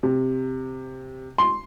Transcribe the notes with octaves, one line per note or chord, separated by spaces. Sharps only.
C3
C6